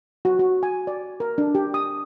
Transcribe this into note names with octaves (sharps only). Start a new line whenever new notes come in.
F#4
F#4
G#5
D5
A#4
D4
G4
D#6